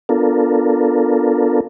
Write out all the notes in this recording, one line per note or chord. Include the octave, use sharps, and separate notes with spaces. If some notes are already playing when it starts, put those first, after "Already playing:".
B3 D4 F4 A4 A#4